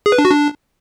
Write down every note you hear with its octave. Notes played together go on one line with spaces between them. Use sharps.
G#4
B4
D4
F#4
D4